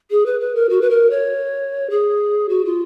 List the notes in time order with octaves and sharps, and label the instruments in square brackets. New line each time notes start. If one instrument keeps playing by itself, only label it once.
[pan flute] G#4
B4
B4
A#4
F#4
B4
A#4
C#5
G#4
F#4
F4